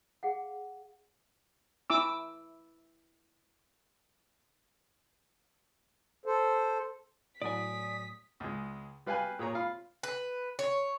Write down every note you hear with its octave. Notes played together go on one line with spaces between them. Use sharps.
G#4 F5 F#5
E4 D6 E6
A4 C5
A2 F#3 D5 G#5 D#6 B6
C#2 G#3
G3 B4 F5 G5 G#5 F#6
A#2 G#4 C#5 A#5
F4 F5 B5
B4
C#5